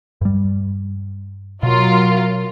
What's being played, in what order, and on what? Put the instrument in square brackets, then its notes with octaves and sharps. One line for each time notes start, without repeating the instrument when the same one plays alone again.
[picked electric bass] G2 G3
[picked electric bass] B2 [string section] F#3 F4 A#4